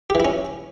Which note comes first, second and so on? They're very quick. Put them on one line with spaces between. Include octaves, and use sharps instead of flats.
G4 E3 E4 C#4